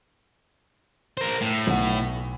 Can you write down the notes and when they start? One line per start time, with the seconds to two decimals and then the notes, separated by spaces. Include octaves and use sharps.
1.17 A#4 C5
1.41 A2
1.67 B1 F#5